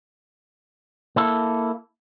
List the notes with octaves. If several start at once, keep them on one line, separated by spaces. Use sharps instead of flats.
A#3 E4 A4